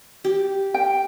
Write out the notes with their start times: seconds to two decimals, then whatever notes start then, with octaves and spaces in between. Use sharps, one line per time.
0.24 G4
0.74 G5